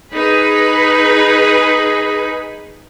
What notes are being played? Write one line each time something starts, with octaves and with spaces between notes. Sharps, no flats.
D#4 G#4 B4 B5